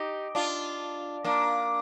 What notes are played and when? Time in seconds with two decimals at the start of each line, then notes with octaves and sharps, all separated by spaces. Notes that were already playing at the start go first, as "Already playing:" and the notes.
Already playing: D#4 G4
0.35 D4 F4
1.24 A#3 D4